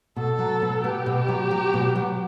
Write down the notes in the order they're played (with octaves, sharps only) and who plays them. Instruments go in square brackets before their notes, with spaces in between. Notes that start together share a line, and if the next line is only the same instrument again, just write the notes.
[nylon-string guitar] B2 [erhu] A4
[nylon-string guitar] F#3
B2
[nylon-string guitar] B3 [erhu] G4
[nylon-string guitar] B2
F#3
F#3
B2
F#3